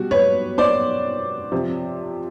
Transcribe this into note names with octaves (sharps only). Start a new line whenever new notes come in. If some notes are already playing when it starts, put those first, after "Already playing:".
Already playing: B2 G3 F#4
B4 C#5
C5 D5
C3 F3